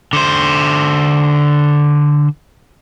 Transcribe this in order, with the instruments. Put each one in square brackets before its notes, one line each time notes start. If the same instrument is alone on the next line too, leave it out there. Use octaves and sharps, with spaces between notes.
[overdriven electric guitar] D3 C5